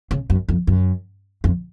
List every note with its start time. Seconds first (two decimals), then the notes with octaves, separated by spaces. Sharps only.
0.11 C#3
0.30 F#2
0.49 F2
0.67 F#2
1.44 F2